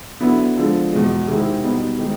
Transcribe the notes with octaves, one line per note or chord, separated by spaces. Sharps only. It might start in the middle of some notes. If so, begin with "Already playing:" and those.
D3 F#3 B3 E4
D3 F3 G#3
E2 B2 G#3
C3 D#3 G#3 C4 E4
B2 G3 B3 D#4
D#3 G#3 C4 D#4